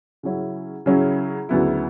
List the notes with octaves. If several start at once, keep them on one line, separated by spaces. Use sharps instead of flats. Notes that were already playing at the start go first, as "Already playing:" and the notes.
C#3 F#3 C#4 E4
C#3 F#3 C#4 E4
D2 C#3 F#3 B3 E4